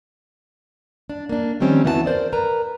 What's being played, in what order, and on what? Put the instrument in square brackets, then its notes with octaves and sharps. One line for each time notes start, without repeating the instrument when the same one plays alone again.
[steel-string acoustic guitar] D4
A#3 D4
D#3 F3 G3 C4 C#4
D2 E3 B3 F#4 D#5 A5
A#4 C5 D5
A#4 B4 A#5